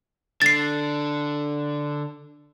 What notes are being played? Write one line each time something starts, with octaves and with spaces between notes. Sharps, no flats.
D3 A6 C7